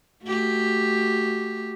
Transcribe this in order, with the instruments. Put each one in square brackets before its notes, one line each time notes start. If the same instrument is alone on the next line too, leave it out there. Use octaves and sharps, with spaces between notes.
[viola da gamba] A3 F#4 G4